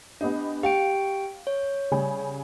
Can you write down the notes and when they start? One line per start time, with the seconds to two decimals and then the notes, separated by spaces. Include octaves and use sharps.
0.21 B3 D4 G4 D#5
0.63 G4 F5 G5 D7
1.47 C#5
1.91 C#3 G3 G#5